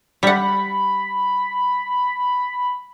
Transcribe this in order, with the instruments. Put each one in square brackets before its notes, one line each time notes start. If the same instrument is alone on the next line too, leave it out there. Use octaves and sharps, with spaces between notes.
[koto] G3 F#5 [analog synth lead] B5